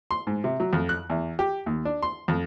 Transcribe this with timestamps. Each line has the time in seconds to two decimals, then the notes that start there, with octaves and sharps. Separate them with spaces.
0.11 C6
0.27 G#2
0.44 C3
0.60 F#3
0.73 F2
0.89 F#6
1.10 E2
1.39 G4
1.66 D#2
1.85 D4
2.03 C6
2.28 F2